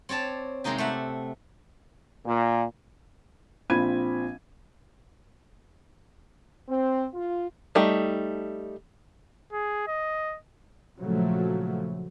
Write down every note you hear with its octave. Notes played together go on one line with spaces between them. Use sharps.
C4 C#5 D5 A5
C3 G#3 A#3 D#4 G4
A3 E5 F#5
A#2
A#1 C4 F4 B5 G#6 D#7
C4
F4
G3 A3 D#4 G5
G#4
D#5
A#2 C#3 F3 F#3 A3